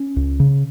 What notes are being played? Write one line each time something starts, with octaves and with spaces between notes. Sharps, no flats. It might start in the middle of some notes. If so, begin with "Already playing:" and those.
Already playing: C#4
C#2
C#3